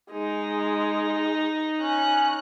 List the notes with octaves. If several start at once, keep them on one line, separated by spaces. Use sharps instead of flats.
G#3 D#4
C#4 F#6